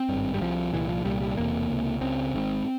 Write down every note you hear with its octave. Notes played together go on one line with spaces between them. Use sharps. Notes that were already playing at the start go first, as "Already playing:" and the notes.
Already playing: C4
G#1 G2
G3
C2 C3 F3
C2 A#2 E3
F3
C2 A#2 G3
G3
E1 E2 C3 A#3
C#2 C3
C#2 C#3 C4
G#1 G#2